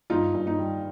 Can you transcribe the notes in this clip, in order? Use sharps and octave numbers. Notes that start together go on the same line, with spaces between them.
G2 D#4 F4
G2
D#4
G3